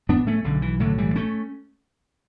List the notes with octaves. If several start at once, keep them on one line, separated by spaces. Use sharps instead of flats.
A2 B3 D4
A3 C#4
B1 D3
E3
A2 D3 F#3
E3 G3
A3 C#4